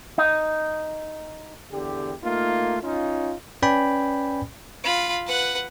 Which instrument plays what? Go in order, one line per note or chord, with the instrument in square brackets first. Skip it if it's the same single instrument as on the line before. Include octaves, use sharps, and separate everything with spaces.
[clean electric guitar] D#4
[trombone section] E2 D3 G4
A3 A#3 D#4 F4
C#4 D#4 F4
[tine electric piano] C#4 B4 D5 G5 G#5 B5
[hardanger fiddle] F4 B5
B4 F#5